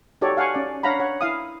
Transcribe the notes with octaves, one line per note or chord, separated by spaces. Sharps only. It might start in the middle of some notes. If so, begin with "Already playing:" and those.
D#4 F#4 G4 A4 C#5 D5
F5 F#5 G#5 A5 C#6
C#4 D5
D4 C#5 F5 F#5 A#5 B5
C#5 F#5
E4 F5 D#6